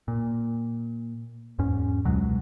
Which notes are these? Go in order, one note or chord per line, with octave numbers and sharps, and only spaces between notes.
A#2
E2 G#2 C#4
C#2 B2 F#3 G#3